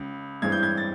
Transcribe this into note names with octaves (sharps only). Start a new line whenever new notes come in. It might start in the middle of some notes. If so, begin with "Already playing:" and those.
Already playing: C#2 C#3
G2 E3 G#3 C4 G#6
G6
G#6
A6